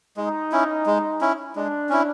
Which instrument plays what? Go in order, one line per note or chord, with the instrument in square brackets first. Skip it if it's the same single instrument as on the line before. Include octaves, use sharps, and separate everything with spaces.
[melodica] G#3 [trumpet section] D#4
[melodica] C#4 E4
G#3
C#4 E4
[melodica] G#3 [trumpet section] D4
[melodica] C#4 E4